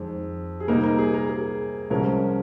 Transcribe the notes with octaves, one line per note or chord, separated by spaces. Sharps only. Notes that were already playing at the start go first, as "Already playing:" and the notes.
Already playing: F2 D#3 G#3
G#4
C3 G3 A#3 D#4 A#4
A#4
G#4
A#4
G#4
C2 C3 F3 G#3 C#4 A#4